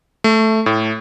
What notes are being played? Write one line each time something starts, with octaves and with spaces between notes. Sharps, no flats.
A3
A2